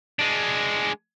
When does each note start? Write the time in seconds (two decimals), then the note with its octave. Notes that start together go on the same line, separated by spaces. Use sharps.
0.19 G#3 D4